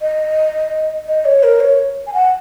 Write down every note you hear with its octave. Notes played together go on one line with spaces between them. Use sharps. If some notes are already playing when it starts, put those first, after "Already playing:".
D#5
D#5
C#5
A#4
C#5
G#5
F#5